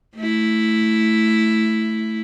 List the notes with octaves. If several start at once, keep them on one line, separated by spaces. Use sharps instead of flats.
A3 E4